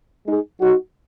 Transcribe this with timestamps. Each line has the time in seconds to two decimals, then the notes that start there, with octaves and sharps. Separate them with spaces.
0.25 G#3 D#4 G#4
0.60 F#3 D#4 F#4